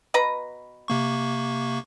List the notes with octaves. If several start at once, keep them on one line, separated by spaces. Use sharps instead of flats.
B2 B4 A#5
C3 A#3 C#6